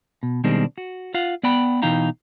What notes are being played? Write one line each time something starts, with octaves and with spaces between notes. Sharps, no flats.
B2
B2 D#3 G3 G#3 C4 D4
F#4
F4 F5 F#5
B3 D5 F#5 G5 B5
B2 E3 D#4 F5 G5 A#5